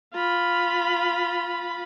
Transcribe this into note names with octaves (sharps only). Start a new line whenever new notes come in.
F4 B5